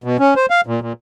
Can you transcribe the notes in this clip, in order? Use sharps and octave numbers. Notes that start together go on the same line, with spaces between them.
B2
C#4
C5
F5
A#2
A#2